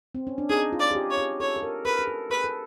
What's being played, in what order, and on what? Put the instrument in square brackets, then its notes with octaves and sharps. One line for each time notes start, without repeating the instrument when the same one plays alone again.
[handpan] C4
C#4
D4
[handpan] D#4 [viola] G#4
[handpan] F4
[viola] D5
[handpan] G#4
G4
[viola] C#5
[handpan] G#4
[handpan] A4 [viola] C#5
[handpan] A4
A#4
[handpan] A#4 [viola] B4
[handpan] G#4
A4
[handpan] G#4 [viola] B4
[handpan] A4